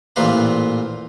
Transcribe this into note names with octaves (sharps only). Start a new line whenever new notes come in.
A1 A#2 C4 F4 B4 A#5